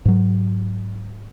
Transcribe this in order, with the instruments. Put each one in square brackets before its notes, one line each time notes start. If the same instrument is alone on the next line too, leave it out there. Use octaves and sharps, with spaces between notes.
[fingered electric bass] G#2 F#3